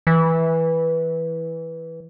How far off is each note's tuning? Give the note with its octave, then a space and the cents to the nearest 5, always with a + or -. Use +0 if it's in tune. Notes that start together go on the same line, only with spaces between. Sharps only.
E3 -10